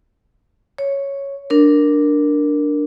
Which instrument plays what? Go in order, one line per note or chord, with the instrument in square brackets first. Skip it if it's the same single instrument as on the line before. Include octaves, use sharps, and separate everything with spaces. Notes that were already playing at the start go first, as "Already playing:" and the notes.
[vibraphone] C#5
D4 A#4